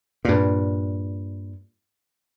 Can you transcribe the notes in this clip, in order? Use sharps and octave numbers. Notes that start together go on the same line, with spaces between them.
G2 A#2